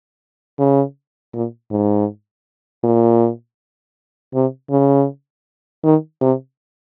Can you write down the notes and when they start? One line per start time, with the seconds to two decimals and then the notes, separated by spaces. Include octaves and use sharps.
0.59 C#3
1.34 A#2
1.71 G#2
2.84 A#2
4.34 C3
4.71 C#3
5.84 D#3
6.21 C3